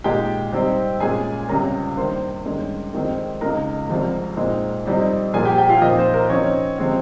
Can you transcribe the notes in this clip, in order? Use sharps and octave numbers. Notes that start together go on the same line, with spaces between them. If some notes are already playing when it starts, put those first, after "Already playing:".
A#2 G#3 D#4 G4 G5
C3 G3 C4 D#4
A#2 G#3 C#4 G#4 G#5
C#2 C3 G3 C#4 A#4 A#5
G2 D#3 A#3 C5 C6
G2 D#3 G#3 C#4
F2 D#3 G#3 C4 D#4
C#2 C#3 G#3 D#4 A#4 A#5
C2 C3 F3 G#3
A#2 G#3 C4 D#4
F2 C3 G3 C4 D#4
A#2 F3 A#3 G#4 G#5
G4 G5
G4 G5
F4 F5
A#2 F3 C4 D#4 D#5
C5
A#4
C3 F3 C4 C#4 D#4 C#5
C3 F3 G#3 C4